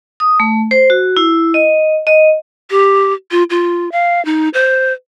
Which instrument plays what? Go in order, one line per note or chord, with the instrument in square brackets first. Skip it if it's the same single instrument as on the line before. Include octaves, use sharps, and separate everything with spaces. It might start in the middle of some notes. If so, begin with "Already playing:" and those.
[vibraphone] D#6
A3
C5
F#4
E4
D#5
D#5
[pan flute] G4
F4
F4
F5
D#4
C5